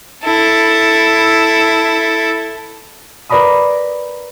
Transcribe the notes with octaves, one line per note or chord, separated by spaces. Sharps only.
E4 A4
A#4 B4 D5 A#5 B5 D#6